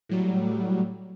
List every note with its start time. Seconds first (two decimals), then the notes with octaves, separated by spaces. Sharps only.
0.09 A2 F#3 G3